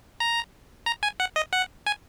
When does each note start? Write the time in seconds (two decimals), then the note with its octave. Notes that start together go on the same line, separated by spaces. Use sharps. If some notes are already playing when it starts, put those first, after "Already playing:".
0.20 A#5
0.86 A#5
1.03 G#5
1.20 F#5
1.36 D#5
1.53 F#5
1.86 G#5